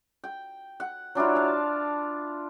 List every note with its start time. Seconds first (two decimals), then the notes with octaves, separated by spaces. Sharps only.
0.24 G5
0.80 F#5
1.15 F#3 D4 E4 F4
1.35 F5 A5